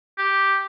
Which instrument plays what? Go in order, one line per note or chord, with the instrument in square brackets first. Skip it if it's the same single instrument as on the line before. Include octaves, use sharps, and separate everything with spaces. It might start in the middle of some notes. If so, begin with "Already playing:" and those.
[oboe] G4